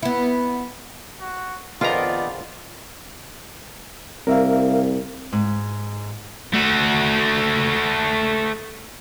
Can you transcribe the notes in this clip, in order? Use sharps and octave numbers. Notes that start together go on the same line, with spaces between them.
B3 E4
F#4
A#1 F2 D#3 B3 F4 D5 A#5
C2 A#4 E5 F5
G#2
A3 F#4